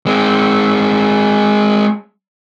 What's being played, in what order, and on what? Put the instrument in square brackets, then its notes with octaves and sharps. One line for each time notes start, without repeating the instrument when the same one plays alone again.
[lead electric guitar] G#3 C4